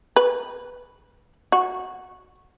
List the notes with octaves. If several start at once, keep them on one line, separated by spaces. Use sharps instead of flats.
B4
F#4